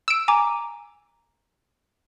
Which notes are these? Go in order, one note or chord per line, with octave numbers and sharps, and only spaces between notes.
E6 D7
G#5 A#5 D6